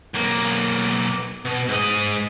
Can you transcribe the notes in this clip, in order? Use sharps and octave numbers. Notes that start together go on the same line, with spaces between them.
B1 A#3
B2
G#2 D#5